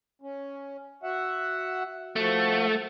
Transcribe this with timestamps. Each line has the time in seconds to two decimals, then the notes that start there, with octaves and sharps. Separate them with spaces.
0.22 C#4
1.03 F#4 E5 F#5
2.16 F3 A3 F#4